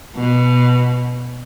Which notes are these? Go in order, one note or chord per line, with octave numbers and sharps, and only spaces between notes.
B2